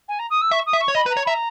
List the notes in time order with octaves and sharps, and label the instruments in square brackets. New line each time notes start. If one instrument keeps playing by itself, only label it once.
[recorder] G#5
A#5
D#6
E6
[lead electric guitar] E5 [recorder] C#6
[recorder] D#6
[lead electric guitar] E5
[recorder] C#6
[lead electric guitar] C#5
[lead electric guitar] D#5 [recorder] B5
[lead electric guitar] B4
[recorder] A#5
[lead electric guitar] C#5
[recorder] B5
[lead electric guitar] E5 [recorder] A#5